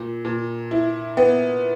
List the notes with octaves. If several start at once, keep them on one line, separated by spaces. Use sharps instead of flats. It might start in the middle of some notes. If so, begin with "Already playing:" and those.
Already playing: A#2
A#2
E4
B3